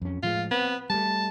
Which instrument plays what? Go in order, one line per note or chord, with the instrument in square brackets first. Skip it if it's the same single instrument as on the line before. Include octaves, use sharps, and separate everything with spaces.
[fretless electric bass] F2 C#4
[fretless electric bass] A2 F3 G#3 [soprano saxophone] F4
[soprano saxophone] B3 [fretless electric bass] C4
[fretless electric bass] G3 A3 [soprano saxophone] A5